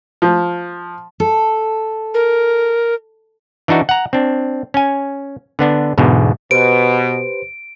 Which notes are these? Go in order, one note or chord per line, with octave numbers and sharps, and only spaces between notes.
F3
A4
A#4
E3 D4 D#4 F#4
F#5 A#5
C4 D4
C#4 G#5
D3 B3 D4
E2 G#2 B2 D3
B2 G4 B4 C5 D7